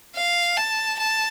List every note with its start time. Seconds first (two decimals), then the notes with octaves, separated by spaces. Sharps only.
0.16 F5
0.57 A5
0.99 A5